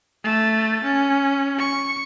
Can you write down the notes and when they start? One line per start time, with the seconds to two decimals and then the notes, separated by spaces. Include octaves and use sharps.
0.24 A3 A6
0.84 C#4
1.59 C#6